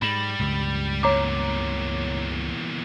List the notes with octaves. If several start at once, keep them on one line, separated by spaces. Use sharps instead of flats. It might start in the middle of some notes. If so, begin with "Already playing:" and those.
G#2 G3 B5 E7 F#7
C#2 G2
E2 A#2 C#5 A#5 D6